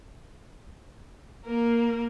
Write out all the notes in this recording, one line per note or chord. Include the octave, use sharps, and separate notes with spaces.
A#3 A#4